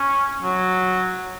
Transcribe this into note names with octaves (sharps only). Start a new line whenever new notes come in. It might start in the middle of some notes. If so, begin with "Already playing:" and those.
Already playing: C#4
F#3